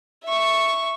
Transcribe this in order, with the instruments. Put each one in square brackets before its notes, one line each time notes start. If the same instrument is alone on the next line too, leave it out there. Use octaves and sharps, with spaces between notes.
[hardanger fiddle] E5 C#6